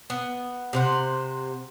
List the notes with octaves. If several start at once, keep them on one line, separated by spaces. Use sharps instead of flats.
B3
C3 C5 F#5